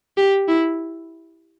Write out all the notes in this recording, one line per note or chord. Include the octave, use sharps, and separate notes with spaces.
G4
E4